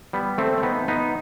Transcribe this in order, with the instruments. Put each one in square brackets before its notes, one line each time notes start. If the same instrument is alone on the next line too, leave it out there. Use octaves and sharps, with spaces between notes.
[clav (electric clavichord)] G3 B3
A3 C4
C4
B3 D#4
B3 D#4